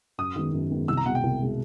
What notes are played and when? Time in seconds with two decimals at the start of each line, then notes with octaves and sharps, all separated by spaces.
0.18 F#2 D#6
0.36 D#3 G#3 B3
0.53 F#2
0.71 D#3 G#3 B3
0.88 C2 E6
0.97 A#5
1.06 B2 F#5
1.09 G#3
1.15 G5
1.23 C2
1.41 B2 G#3